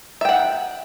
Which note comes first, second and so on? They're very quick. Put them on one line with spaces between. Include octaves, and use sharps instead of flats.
E5 G5 F#5